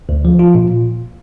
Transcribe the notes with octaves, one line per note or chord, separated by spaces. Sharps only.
D2
F3
F4
A#2